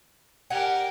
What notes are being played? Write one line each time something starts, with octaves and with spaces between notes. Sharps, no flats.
G4 A#4 F#5 G#5